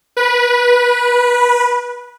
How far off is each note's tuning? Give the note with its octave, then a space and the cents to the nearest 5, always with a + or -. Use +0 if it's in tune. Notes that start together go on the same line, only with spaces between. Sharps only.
B4 -20